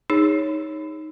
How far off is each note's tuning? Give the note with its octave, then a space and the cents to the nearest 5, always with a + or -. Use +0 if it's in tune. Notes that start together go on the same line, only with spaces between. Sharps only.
D#4 +0 G#4 -30 C#5 +0